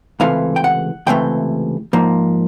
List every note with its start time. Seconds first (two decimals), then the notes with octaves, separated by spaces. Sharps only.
0.20 C#2 C3 E3 A3 F5
0.56 G5
0.64 F#5
1.07 C#2 C3 E3 A3 G5
1.93 G#2 F3 A#3